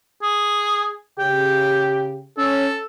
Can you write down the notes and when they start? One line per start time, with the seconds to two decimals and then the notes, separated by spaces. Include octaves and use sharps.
0.22 G#4
1.19 C#3 G4 G5
2.38 C#4 A4